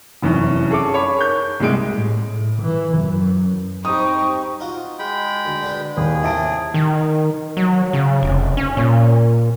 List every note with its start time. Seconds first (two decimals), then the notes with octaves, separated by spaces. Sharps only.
0.22 F1 F#2 E3 C#4
0.71 G#4 A4 C#5 D6
0.94 C#5 B5
1.17 A#4 C#6 G6
1.60 C2 G3 G#3 D7
1.92 A2
2.31 A2
2.62 E3
2.98 F#2
3.85 G3 C4 D#4 G4 G#4 C#6 D#6
4.60 D#4 F4 F#4
4.99 G#3 G5 B5
5.45 D2
5.63 D3 B4
5.97 D#2 G#4
6.23 A2 C3 A#3 E5 A5 D7
6.74 D#3
7.57 F#3
7.93 C#3
8.23 F1
8.57 C#4
8.77 A#2